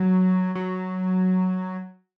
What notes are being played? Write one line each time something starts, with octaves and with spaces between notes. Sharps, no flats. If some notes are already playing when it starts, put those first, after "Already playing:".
Already playing: F#3
F#3